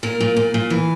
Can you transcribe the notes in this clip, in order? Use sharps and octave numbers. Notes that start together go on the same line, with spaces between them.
A#2 A#4
A#2
A#2
A#2
E3